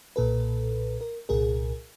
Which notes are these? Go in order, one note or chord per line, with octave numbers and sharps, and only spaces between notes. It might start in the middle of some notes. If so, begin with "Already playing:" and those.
B1 A#2 A4 B4
A#4
C2 A#2 G#4 A#4